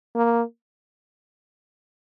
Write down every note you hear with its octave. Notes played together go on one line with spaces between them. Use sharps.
A#3